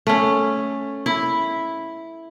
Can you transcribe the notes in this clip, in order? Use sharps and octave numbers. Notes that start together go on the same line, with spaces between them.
A3 C#4
E4